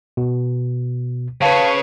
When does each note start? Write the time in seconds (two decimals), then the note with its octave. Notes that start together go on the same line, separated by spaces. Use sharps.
0.17 B2
1.42 C#3 B4 C#5 F5 A5